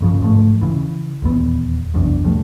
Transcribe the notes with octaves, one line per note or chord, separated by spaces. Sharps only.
G1 C#3 F3
G#2 F3 G3 A3
C#3 E3
D#1 E2 B3
F1 B1 E2 D4
B2 F3 G3 A3